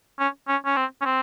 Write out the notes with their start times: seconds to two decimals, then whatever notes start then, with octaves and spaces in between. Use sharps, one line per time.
0.19 C#4
0.48 C#4
0.66 C#4
0.77 C4
1.01 C#4
1.05 C4